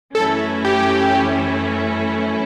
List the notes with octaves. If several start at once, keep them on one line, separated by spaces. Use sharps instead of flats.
F#2 E3 A3 C#4 E4 A4
G4